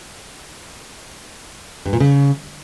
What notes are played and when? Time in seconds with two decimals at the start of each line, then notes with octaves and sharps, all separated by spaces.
1.86 G2
1.93 A#2
2.00 C#3